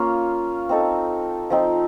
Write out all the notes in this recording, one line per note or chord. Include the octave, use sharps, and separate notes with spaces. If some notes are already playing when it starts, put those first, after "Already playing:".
Already playing: A#3 C#4 F4 F5
C4 D#4 A4
F3 C4 D#4